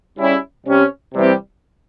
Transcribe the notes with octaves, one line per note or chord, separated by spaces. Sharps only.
C#3 G3 C#4 E4
C3 G3 C#4
C3 E3 G3 C4 G4